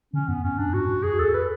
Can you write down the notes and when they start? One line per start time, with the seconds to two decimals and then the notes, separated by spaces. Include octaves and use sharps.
0.13 D3 C#4
0.28 F#2 B3
0.44 F#2 C#4
0.58 F#2 D4
0.74 G#2 F#4
0.89 G#2
1.03 F#2 G#4
1.18 E2 A4
1.34 B4